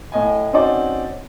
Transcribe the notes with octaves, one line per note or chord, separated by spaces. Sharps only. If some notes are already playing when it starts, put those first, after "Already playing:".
A2 D#5 G#5
C4 C#4 D#4 F#4 D5